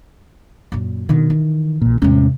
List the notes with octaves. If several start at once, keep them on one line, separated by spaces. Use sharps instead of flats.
F#2 A#2
B2 D3 D#3
E3
A#1 A#2
E2 A2 C3 G#3 C#4